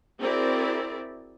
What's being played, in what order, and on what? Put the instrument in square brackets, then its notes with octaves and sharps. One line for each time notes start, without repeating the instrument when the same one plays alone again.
[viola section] C4 E4 F#4 G#4 A#4 D5